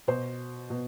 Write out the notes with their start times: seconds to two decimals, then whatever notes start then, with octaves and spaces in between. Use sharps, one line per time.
0.08 B2 C5
0.70 B2